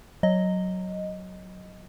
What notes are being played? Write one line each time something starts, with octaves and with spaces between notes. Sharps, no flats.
F#3 D#5